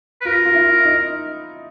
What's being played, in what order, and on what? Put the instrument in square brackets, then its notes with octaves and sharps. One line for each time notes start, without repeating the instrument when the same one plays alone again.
[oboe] B4
[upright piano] F4 [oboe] A#4
[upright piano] F4
E4
D#4